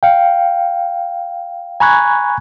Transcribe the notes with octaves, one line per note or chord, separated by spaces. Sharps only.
F5 G5
G#5 A#5 B5 C#6 F#6 G#6